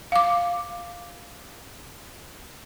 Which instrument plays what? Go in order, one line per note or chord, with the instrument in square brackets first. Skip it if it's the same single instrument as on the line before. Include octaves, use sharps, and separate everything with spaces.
[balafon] F5 D6